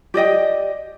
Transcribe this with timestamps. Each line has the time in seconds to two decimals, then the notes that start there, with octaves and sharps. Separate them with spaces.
0.14 G4 D5 D#5 G5